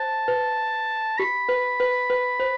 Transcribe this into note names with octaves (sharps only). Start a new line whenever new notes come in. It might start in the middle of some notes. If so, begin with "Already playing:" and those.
Already playing: C5 A5
B4
G4 B5
B4
B4
B4
C5